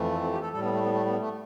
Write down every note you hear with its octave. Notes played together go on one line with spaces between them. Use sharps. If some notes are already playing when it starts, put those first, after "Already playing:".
Already playing: F2 E3 A3
C4
C4
G4
A4
A2 G3 A4
B3
A3
B3
A3
B3
A3